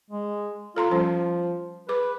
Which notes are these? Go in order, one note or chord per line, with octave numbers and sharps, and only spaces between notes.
G#3
F4 A4 A#5 C6
F3 G3 C#4 C5
G#4 B4 D6